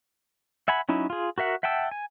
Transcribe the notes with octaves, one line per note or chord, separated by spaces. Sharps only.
E5 F#5 G#5 B5
F#3 C#4 D#4 E4
F4 G#4
F#4 A#4 E5 F#5
E5 F#5 G5 A5 E6
G#5